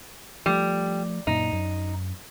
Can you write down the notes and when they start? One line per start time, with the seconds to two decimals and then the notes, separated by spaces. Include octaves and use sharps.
0.46 F3 G3 A3
1.27 F#2 A#2 D#4
1.53 F#2